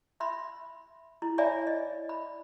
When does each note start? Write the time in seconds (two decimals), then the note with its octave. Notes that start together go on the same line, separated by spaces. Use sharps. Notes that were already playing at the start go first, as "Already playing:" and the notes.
0.20 E5 B5 C6
1.22 E4
1.38 D#4 C#5 D5 E5 G#5 B5
1.67 D#5
2.09 B5